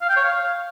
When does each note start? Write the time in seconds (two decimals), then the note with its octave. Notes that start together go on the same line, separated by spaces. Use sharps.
0.02 F5
0.09 G5
0.17 C#5
0.24 F5